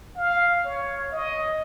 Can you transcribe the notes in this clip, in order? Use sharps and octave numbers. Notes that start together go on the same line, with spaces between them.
F5
C#5
D#5